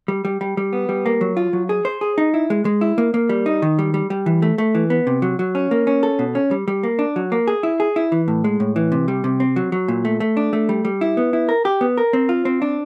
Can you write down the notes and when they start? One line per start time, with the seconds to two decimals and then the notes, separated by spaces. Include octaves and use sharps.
0.08 G3
0.25 G3
0.41 G3
0.57 G3
0.73 B3
0.89 G3
1.06 A#3
1.21 F#3
1.37 F4
1.53 F#3
1.69 G#4
1.85 C5
2.01 G#4
2.18 D#4
2.34 E4
2.50 G#3
2.65 G#3
2.81 E4
2.98 A#3
3.14 A#3
3.29 G3
3.46 D#4
3.62 D#3
3.79 G3
3.94 G3
4.10 G3
4.26 E3
4.42 A3
4.58 A3
4.75 E3
4.90 B3
5.07 C3
5.22 F#3
5.39 F#3
5.55 C#4
5.71 A#3
5.87 C#4
6.03 A4
6.19 B2
6.35 C#4
6.51 G3
6.68 G3
6.83 A#3
6.99 D4
7.16 F#3
7.32 A#3
7.48 G#4
7.63 E4
7.80 G#4
7.96 E4
8.12 E3
8.28 A2
8.44 G#3
8.60 A2
8.76 E3
8.92 C3
9.08 G3
9.24 C3
9.40 C4
9.56 F#3
9.72 F#3
9.88 A#2
10.05 A3
10.20 A3
10.37 D4
10.53 A3
10.69 G3
10.85 G3
11.01 E4
11.17 B3
11.33 E4
11.49 A#4
11.65 G4
11.81 B3
11.98 A#4
12.13 C4
12.29 F4
12.45 C4
12.62 D4